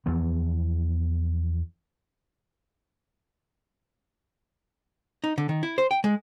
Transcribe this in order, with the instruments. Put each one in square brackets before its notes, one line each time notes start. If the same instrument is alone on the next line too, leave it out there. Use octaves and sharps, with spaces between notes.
[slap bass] E2 E3 F3 B3
[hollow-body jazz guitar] D#4
D3
D#3
E4
C5
G5
G#3